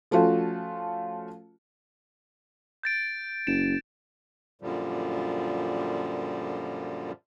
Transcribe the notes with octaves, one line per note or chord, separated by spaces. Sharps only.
F3 A3 C#4 F4 F#4
G6 A6 D7
F#1 D7 E7
F#2 A#2 D3 F3 G3